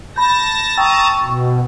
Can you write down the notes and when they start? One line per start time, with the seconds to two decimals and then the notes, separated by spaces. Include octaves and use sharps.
0.16 A5 B5 G6 A#6
0.77 G5 A5 A#5 C#6 D#6 E6 A6
1.21 B2